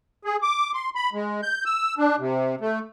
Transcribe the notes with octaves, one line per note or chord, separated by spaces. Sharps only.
G#4
D6
C6
B5
G#3
G6
E6
D4
C3
A3